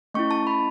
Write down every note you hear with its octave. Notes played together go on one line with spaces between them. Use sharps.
A3 C#4 E4 C#6
A5
B5